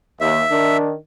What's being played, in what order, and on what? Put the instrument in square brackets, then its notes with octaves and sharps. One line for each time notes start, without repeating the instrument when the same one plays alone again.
[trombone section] D#2 [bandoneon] E5
[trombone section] D#3 D4